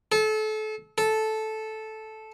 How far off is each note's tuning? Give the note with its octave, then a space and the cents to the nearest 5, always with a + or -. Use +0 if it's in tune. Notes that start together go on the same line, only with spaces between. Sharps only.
A4 -30
A4 -10